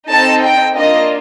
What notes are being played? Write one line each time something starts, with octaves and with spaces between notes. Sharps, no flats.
C4 D#4 A4 A5
G5
A#3 D4 F4 D#5